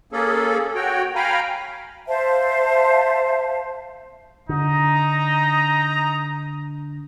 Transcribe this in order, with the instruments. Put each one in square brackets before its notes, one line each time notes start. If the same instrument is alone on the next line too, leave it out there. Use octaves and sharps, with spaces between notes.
[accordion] A#3 C#4 G#4 A4
F#4 C#5 G5
F5 G5 G#5 A#5 B5
[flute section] C5 E5 F5 A5
[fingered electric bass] D3 [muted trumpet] D#4 [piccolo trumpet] A#5